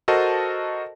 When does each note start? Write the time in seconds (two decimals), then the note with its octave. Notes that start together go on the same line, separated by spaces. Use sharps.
0.08 F#4 A4 A#4 C5 D#5 A5